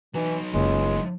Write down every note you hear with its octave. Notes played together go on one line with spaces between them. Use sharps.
E3 F#3 D#4
F#1 C#2 G#3